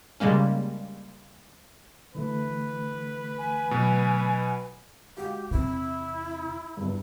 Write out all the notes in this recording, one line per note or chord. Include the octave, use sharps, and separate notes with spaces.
C#3 G3 G#3 A#3 C#4
D3 E3 A3 B4
G#5
B2 F#3
G#3 F#4 G4 F5
E2 C3 C4 E4
E2 G2